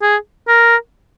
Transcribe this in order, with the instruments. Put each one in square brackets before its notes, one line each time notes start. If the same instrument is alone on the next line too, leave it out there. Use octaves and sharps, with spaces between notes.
[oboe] G#4
A#4